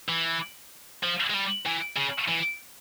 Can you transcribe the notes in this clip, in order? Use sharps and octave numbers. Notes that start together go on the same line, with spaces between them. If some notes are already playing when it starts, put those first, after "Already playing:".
E3
F3
G#3
G3
E3
C#3
E3